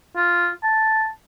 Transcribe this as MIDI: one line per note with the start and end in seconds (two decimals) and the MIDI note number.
0.16 0.49 65
0.63 1.08 81